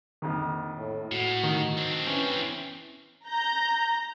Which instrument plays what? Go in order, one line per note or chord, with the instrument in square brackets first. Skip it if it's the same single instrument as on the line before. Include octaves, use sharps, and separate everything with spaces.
[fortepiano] A#1 F2 D#3
[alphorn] A2
[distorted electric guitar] A2 [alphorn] F#4
[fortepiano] D#3
[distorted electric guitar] C4 D4
[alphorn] E3 [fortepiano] C#4
[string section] A#5 G6 A#6